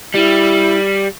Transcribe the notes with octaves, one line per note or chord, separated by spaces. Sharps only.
G3 E4